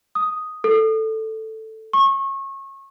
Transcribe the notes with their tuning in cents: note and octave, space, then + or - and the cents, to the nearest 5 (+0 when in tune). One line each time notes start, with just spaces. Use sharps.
D#6 +0
A4 +5
C#6 -30